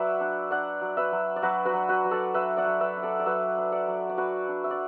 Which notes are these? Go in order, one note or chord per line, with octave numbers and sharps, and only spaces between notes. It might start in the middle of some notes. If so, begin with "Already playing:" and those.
Already playing: F#3 B4 D5 E5 F#5
D4
D4 D5 F#5
F#3
B4 E5
F#3
D5
F#3 F#4 B4
F#4 B4
F#3
F#4 B4
F#3
A4 D5
D4 B4 E5
D5 F#5
F#3
B4 E5
D4
A4 D5
D5
F#3 B4 E5
D4
D5 F#5
F#3
D5
D4 F#4 B4
D4
E5
D5